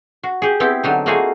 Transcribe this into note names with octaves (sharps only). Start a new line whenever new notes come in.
F#4
G4 G#4
B3 C4 E4 G4
D3 F#3 D4 D#4
A3 A#3 D#4 F4 F#4 G#4